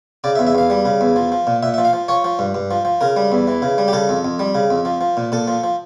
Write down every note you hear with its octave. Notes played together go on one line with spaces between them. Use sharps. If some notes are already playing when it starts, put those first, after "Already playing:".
C#3 D5
E5
E2
E5
E2 F5
G3
C#3
E2
F3
F3
A#2
A#2 E5
E5
F3
F5
F3
F3 C#5
F3
G2
G2
F3
F3
C#3 A#4
G3
E2
E3
C#3
G3
G4
C#3 A4
F2
F2
G3
C#3
F2
F3
F3
A#2
A#2 A4
F3
F3